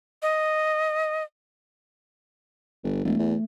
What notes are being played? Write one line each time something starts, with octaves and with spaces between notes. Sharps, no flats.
D#5
G1
E1 A3
E2